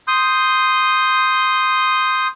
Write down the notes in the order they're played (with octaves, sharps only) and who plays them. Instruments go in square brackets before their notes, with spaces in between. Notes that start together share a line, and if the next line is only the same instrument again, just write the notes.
[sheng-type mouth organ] C6 D#6 G6